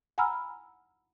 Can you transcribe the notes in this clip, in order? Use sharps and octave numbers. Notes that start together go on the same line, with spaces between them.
F#5 G#5 A#5 B5 E6 F6